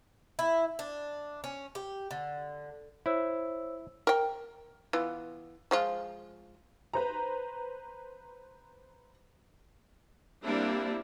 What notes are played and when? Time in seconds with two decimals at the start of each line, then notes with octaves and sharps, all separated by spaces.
0.39 E4
0.79 D4
1.44 C#4
1.75 G4
2.11 D3
3.06 E4 C5 C#5 E6
4.07 A#4 G5
4.93 E3 B3 F4
5.71 F3 G#3 F4
6.93 B4 C5 A#5
10.45 G3 A#3 C4 D4 E4